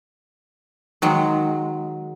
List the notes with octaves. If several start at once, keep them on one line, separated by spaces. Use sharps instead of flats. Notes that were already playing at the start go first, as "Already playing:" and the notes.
D#3 F#3 G#3